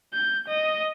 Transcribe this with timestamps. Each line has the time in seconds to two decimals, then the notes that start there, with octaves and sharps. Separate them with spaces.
0.13 G6
0.48 D#5